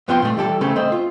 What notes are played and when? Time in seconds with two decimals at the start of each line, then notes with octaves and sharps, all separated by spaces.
0.08 F2 B3 C4 F4 G5 C6
0.22 A#2 A3
0.37 E3 G3 G4 A4
0.61 C2 C#3 A3 C4
0.76 A3 C4 C5 D#5
0.92 F4